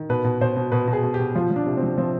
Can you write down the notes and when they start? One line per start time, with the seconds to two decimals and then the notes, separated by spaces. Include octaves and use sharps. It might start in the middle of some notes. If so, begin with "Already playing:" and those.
Already playing: D#3
0.09 B2 B4
0.24 B2
0.41 B2 C5
0.56 B2
0.72 B2 B4
0.88 B2
0.93 G#4
1.03 B2
1.14 G4
1.19 B2
1.35 F3 F4
1.51 F3
1.56 D4
1.66 C3
1.77 C4
1.83 F3
1.98 F3 C4